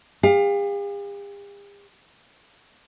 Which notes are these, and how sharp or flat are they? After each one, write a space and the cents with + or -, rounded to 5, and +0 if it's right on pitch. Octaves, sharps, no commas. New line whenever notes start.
G4 +45 F5 +20